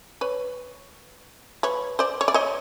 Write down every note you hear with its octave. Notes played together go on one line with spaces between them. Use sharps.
B4 C#5
B4 C#5
C5 D5
C#5
D5
C#5 D#5